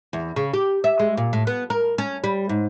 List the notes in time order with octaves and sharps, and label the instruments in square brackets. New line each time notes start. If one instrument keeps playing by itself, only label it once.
[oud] E2
C#3
G4
E5
G#3
A#2
A2
B3
A#4
C#4
G3
G#2